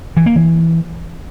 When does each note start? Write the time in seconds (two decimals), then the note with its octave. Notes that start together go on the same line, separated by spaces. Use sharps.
0.17 E3
0.26 A#3
0.36 E3